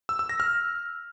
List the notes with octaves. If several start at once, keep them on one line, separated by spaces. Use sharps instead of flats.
E6
E6
A#6
F6